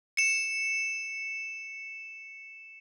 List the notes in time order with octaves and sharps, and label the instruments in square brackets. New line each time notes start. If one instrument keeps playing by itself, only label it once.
[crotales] C#7 E7